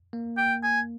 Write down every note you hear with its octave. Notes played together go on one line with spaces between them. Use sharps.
A#3
G5
G#5